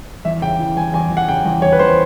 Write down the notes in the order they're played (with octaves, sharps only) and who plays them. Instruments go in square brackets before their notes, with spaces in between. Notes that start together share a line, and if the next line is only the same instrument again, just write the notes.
[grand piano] E2 E5
C#3 G5
E3
E2 G#5
E2 G#5
E2
F#5
C#3 G5
E2
E2 C#5
B4
E2 C5